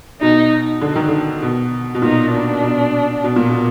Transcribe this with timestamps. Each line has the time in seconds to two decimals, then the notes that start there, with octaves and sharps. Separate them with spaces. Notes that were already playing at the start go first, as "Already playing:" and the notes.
0.21 B2 D#4
0.81 D3
0.95 D#3
1.08 D3
1.42 B2
1.94 B2
2.02 A#2 D#4
2.32 D4
2.63 B2
3.24 B2
3.36 A#2
3.49 B2